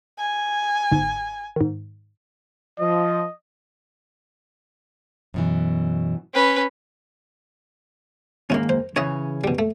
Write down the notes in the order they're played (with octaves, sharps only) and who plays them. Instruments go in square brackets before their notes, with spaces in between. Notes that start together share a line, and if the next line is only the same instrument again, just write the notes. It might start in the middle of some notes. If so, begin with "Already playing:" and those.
[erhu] G#5
[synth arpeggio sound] G1 G#2
G#2 D#3
[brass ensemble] F3 [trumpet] D#5
[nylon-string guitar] F#2 B2 E3
[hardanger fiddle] C#4 B4
[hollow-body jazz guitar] D#2 G#2 A#3 [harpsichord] C#4 E4
[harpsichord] C5
[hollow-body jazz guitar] C#3 E3 C#4 [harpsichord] C#5 D#5 E5
[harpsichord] B2 G3
A3